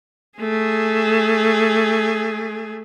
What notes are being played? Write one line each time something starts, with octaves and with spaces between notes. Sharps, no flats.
A3 G#4